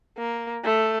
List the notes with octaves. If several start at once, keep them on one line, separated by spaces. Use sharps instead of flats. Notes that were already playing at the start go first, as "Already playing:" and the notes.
A#3
A3